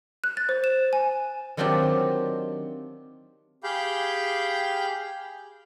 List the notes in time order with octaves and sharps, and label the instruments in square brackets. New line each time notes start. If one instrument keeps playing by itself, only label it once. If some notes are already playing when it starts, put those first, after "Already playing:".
[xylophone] F#6
A6
C5
E7
G#5
[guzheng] D#3 F#3 C4 D4 F4 G4
[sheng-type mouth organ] G4 G#4 F5 G5 B5 G6